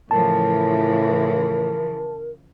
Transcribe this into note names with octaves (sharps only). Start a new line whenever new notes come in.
A2 C#3 E3 F3 A#4 A5